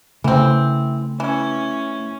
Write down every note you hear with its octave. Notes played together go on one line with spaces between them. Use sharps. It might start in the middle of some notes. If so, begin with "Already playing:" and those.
C#3 E3 A3 C4
E3 C#4